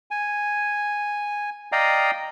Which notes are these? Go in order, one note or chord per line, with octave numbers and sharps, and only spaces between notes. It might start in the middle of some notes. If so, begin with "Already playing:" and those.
G#5
D5 D#5 F5 G5 A#5 D#6